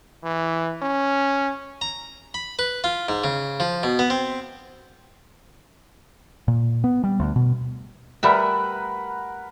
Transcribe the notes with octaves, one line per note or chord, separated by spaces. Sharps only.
E3
C#4
A#5
B5
B4
F4
G#2
C#3
F3
B2
B3
C4
A#2
B3
G3
D2
B2
G3 A3 A#4 B4 E5 F#5